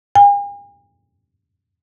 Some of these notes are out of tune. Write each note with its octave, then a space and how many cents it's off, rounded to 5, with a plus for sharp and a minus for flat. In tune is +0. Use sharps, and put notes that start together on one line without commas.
G#5 -45